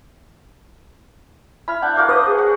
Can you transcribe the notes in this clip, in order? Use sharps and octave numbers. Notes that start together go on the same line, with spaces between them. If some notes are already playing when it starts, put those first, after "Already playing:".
E4 B5 F6
D4 F#5 G6
F#4 A#4 F5 D6
B4 C5 D#6
G#4
F#5